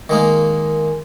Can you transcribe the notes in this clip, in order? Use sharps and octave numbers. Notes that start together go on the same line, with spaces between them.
D#3 G#3 A#3